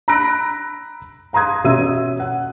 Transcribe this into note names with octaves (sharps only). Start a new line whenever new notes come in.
A#5 B5 E6 F#6 A#6 D7
F5 A#5 C6 D#6 G#6
B2 C#4 E5 E6 D#7
F#5